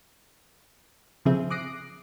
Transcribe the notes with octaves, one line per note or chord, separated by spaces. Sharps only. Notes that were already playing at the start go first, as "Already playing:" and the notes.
C#3 F3 C4 G#4 E5
D6 D#6 F#6 A#6 C7 D7